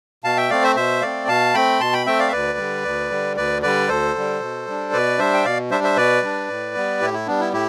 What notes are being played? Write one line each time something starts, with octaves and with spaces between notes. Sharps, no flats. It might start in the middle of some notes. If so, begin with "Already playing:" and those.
B2 F5 A5
E5 G5
A3 C4 D5 F5
C5 E5
B2 C5 E5
A3 C4 D5 F5
B2 F5 A5
A3 C4 G5 B5
B2 A5 C6
G5 B5
A3 C4 E5 G5
D5 F5
E5
D2 B4 D5
D3 G3
D2
D3 G3
D2 B4 D5
D3 G3 B4 D5
D2 A4 C5
D3 G3
B2
G3 D4
B2 B4 D5
G3 D4 C5 E5
G5
B2 D5 F5
G3 D4 C5 E5
C5 E5
B2 B4 D5
G3 D4
A2
G3 B3
A2 E4 G4
E4
G3 B3 D4
E4
A2 E4 G4